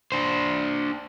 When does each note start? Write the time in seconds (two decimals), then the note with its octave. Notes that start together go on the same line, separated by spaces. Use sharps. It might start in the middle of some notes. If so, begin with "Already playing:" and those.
0.12 D4 C5